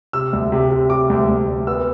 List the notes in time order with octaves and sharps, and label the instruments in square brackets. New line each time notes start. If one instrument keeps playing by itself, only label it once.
[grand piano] C3 E6
D2
C3
C3
C3 D6
D2
D2
D2
B3 E6